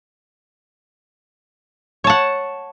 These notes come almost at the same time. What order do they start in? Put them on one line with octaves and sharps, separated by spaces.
C#5 A5 F#5